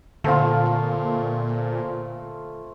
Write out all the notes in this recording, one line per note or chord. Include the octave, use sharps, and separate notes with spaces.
A#2 D3 A3 C4 F4